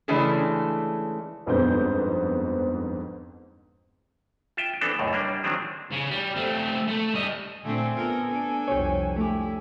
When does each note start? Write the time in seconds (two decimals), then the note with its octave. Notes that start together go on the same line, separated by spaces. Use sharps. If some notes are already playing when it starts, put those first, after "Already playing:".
0.08 C#3 E3 G#3 A3 C#4 D4
1.46 G1 F2 G#2 B3 C5 G6
4.57 F4 E5 G5
4.81 E3 B3 C4 D4 A4
4.99 C#2 F#2 A2
5.13 G3 A#3 D4
5.44 D#3 F3 F#3 G#3 C4 D4
5.92 C#3
6.11 G3
6.36 A3 C4
6.87 A3
7.14 G3 D#5
7.63 A#2 D3 A3 C4 G#5
7.93 B3 F4 A4 A#4
8.26 D4 A4
8.68 C2 F2 G4 C#5
9.16 A3 E4 G4